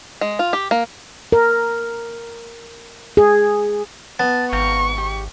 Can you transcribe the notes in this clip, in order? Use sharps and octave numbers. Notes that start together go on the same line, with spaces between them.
G#3
F4
G4
A#3
A#4
G#4
B3 A5
G#1 F5 G5 A#5 C#6
G4